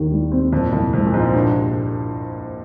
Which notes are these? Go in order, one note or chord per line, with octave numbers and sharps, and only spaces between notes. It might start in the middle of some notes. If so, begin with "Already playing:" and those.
Already playing: D#2 D#3
G3
C4
F2 A#2
C2 F2
F2 G#3
A#2
C2 G#2
G2 A#2